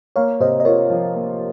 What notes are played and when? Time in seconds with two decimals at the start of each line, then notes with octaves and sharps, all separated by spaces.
0.16 A#3 C#5 F5
0.40 C3 C5 D#5
0.60 D#5
0.65 F4 A#4 C#5
0.90 F3
1.15 A#3